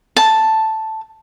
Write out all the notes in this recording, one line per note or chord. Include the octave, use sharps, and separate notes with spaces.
A5